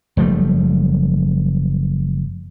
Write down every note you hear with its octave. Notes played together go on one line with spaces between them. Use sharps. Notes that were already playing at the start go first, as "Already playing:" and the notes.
F#1 F3 G3 A3